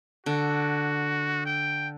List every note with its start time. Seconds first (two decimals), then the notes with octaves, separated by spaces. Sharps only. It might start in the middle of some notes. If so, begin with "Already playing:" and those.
0.26 D3 F#4
1.45 G5